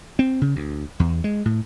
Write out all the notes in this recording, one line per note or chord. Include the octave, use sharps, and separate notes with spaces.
C4
C#3
D2
E2
G#3
A2